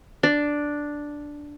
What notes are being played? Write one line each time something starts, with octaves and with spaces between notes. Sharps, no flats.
D4